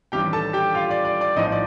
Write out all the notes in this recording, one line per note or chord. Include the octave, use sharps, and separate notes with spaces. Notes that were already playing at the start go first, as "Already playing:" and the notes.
A1 G2 D#3 G3 G4 G5
A4 A5
G4 G5
F4 F5
D5
D5
D5
A#1 A2 F3 D#4 D#5
D5